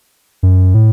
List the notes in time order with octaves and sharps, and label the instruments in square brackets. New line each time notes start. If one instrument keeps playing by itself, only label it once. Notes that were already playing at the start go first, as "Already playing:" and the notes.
[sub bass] F#2
A2